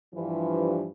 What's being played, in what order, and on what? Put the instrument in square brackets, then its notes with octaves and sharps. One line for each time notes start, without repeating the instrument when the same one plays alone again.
[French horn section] G2 E3 F3